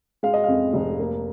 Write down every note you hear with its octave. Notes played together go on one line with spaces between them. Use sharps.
G#3 F5
D#5
F2 F5
F1
A#3